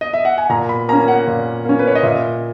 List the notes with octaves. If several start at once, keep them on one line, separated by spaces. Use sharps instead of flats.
D#5
E5
F#5
G#5
A#2 A#5
B5
A#3 C#4 A#5
F#5
A#2
A#3 C#4
B4
C#5
D#5
A#2 E5